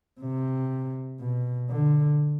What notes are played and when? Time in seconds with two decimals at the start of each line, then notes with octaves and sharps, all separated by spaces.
0.21 C3
1.20 B2
1.70 D3